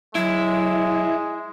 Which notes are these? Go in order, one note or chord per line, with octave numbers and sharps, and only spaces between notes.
F#3 G#3 E4